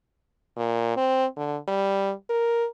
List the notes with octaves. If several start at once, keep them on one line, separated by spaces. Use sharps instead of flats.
A#2
C4
D3
G3
A#4